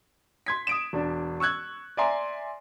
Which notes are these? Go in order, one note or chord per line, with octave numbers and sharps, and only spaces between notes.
C6 G#6 B6
D#6 D7 E7
E1 D4
C#6 E6 F#6 G#6
D5 E5 G#5 A#5 C6